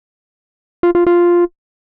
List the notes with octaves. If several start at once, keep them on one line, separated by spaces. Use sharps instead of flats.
F4
F4
F4